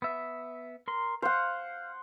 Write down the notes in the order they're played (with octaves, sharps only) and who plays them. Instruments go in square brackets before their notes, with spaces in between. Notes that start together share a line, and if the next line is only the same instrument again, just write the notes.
[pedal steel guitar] B3 E5
A#4 C6
[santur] C5 F#5 [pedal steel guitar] F5